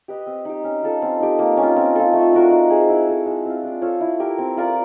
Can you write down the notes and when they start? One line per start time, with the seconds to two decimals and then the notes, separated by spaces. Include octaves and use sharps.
0.08 G4 B4 D#5
0.27 C4
0.45 D#4 G4
0.64 C#4
0.83 F4 A4
1.02 C4
1.20 D#4 G4
1.39 A#3
1.57 C#4
1.62 F4
1.76 C4
1.96 F4 A4
2.13 A3
2.33 D4 F#4 A#4
2.51 D#4
2.70 G#4 C5
2.89 E4
3.07 A4 C5
3.26 G#3
3.45 C4 F4
3.63 D4
3.82 F4 A4 C#5
4.01 E4
4.20 G4 A#4
4.38 C4
4.57 F4 A#4 D5